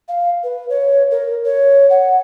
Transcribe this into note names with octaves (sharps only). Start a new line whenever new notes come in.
F5
B4
C#5
A#4
C#5
F#5